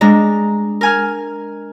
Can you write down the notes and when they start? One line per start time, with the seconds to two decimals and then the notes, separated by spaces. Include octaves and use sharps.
0.01 G#3 D4 A#5
0.81 A#4 G#5 F6